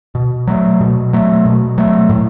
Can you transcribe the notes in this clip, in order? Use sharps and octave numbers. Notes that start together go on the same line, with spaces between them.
B2
F#3 A3
B2
F#3 A3
B2
F#3 A3
A2